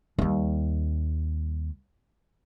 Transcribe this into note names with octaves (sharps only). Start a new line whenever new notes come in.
D#2 G3